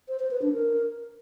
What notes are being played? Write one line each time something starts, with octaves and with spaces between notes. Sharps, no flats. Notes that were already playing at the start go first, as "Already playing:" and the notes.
C5
C5
B4
D4
A#4